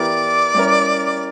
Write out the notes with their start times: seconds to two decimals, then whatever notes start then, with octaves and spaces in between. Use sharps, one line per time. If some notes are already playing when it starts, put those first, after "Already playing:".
Already playing: E3 B3 E4 G4 A#4 D5
0.55 G3 C#4 E4 A#4